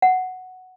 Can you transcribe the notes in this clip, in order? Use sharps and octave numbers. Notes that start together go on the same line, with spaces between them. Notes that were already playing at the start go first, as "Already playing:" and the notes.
F#5